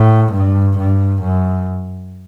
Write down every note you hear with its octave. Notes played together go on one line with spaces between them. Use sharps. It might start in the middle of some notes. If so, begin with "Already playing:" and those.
Already playing: A2
G2
G2
F#2